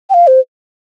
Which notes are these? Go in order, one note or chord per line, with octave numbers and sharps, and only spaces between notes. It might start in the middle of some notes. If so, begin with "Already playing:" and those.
G5
F5
C5